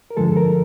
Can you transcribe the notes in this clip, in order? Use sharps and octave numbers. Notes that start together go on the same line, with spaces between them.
A#4
G2 D3 F3 G#3 A4
A#4